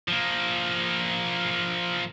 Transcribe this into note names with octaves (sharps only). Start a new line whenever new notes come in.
F3 A#3